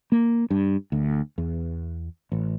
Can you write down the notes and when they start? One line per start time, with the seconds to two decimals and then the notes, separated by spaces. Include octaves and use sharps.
0.12 A#3
0.50 G2
0.92 D2
1.38 E2
2.32 A1